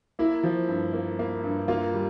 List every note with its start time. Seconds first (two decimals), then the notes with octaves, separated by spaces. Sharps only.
0.19 A#3 E4
0.43 F3
0.68 G2
0.93 A#3
1.19 A#3
1.44 G2
1.68 A#3 F4
1.94 G3